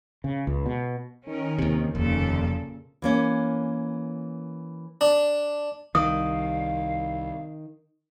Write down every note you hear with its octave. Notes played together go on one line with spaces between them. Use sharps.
C#3
C#2
B2
D#3 C#4 A#4
D#2 C3
F1 D#2 A#2 C#3 A4
E3 A#3 C#4
D4
C2 D#3 F5 D#6